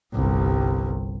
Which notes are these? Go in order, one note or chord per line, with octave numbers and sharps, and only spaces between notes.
G1 C2